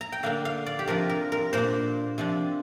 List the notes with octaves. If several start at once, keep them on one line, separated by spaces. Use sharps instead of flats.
A#5
G5
D3 A#3 D4 F5
F5
D5
G4
C3 F3 D4 F4 A#4
A#4
A#4
A#2 A#3 D4 C5
C3 F3 D4